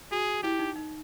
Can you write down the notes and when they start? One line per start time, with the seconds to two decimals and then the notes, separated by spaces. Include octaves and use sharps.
0.11 F#4 G#4
0.43 E4 G4
0.59 D#4
0.76 D#4